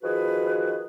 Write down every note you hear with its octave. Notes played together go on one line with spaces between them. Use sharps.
D#3 F3 F#4 G#4 B4